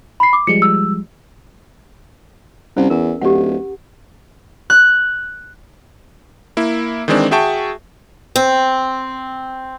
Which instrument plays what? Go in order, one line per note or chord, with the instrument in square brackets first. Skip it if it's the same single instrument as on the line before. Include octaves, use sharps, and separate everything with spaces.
[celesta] B5 C7
D6
[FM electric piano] F3 G3 G#3 [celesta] C#7
[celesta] E6
[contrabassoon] C2 [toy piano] C#4
[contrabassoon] E2 [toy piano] A#4
[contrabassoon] D1 [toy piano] G4 F#5
[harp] F#6
[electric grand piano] A#3 E4
D#3 E3 G#3 C4 D4
F#4 G#4 E5 G5 A5 C#6
[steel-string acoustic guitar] C4